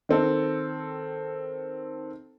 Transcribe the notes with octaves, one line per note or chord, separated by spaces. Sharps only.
D#3 C4 A4